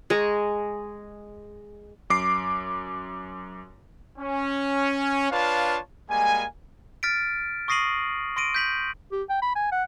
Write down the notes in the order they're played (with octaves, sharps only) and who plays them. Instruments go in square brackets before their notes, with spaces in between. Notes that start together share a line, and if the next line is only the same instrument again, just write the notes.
[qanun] G#3 A#5 C#6
[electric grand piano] F#2 D6 C7
[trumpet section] C#4
D4 F4 B4 C#5 F5 A5
G3 G#3 A#3 G#5
[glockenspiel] F6 A6 B6 D7
C#6 D#6 A#6 C7 D#7 F#7
C6 A#6 D7 D#7
G6 B6 F#7
[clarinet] G4
G5
B5
G#5
F#5